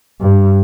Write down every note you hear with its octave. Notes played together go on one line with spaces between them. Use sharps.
G2